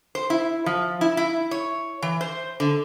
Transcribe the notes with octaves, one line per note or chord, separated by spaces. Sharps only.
C5
E4
F3
E4
E4
C#5
E3
C5
D3